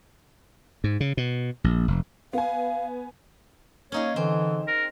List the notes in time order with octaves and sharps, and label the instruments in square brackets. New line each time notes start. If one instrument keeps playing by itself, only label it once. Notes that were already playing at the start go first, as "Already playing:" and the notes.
[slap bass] G#2
C#3
B2
A#1
F1
[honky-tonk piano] B3 G#5 [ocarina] F5
[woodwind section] A#3 C#5 [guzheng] C#4 D#4 G#4
[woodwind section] D3 E3 [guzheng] C4
[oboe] A#4